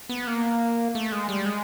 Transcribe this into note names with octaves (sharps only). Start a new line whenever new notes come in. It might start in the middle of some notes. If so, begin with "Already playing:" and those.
B3
A#3
A3
G#3
G3
G#3